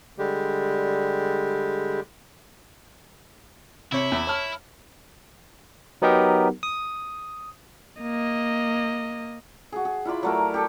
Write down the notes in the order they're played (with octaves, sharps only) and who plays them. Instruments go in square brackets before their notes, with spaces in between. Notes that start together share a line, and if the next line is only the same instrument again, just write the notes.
[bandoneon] D3 G3 G#3 G4
[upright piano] C3 C#5 C#7 [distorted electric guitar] E4
[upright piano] E2 E5
C#5 A5 F6
[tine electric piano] F#3 B3 D#4 G4 A#4
D#6
[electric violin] A#3 D#5
[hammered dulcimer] F#4 G#4
G#4
E4 F4 D5 B5
F#3 A3 A#4
G4 A4